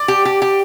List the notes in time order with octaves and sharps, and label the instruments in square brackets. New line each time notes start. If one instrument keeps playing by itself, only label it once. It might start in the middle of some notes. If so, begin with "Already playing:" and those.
Already playing: [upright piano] D5
[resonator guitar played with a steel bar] G4
G4
G4